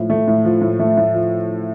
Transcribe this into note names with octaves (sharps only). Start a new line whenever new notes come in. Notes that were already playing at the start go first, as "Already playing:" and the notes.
Already playing: A2 F3
A3
A2
F3
A2
A3
A2
F3